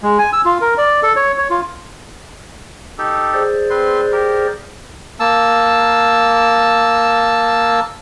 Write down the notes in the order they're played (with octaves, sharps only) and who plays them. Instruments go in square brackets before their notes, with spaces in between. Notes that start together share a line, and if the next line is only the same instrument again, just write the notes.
[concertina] G#3
G#5
E6
F4
A#4
D5
A4
C#5
C#5
F4
[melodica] D#4 G4 A4
[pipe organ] G#4 C5 D5
[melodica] C4 B4 C6
G4 A#4
A#3 A5 E6